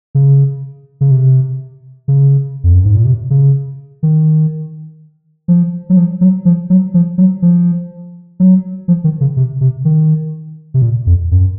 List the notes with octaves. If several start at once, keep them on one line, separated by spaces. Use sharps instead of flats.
C#3
C#3
C3
C#3
F2
F#2
G#2
A#2
C3
C#3
D#3
F3
F#3
F3
F#3
F3
F#3
F3
F#3
F3
F#3
F3
D#3
C#3
C3
C3
D#3
C3
A#2
F2
F#2